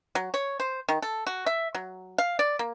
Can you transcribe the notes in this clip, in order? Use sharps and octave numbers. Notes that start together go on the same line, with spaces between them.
F#3
C#5
C5
D#3
A4
F#4
E5
F#3
F5
D5
A#3